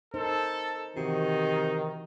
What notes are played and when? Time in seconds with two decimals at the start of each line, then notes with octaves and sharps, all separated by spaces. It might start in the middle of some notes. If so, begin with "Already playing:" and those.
0.14 D#4 A4 A#4 C5
0.96 C3 D#3 E3 D#4 F#4